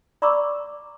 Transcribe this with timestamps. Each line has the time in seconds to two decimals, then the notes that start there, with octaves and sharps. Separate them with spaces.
0.22 D5 A#5 B5 C#6 D6 E6